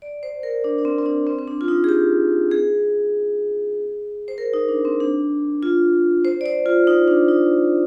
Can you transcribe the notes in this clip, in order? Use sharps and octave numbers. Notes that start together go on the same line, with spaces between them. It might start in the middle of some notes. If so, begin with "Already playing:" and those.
D5
C5
A#4
D4
D4
C4
C4
D4
C4
C4
D4
F4
D#4
G#4
G4
G#4
C5
A#4
D#4
D4
C4
D4
F4
C5
D5
C5
F4
D#4
D4
D#4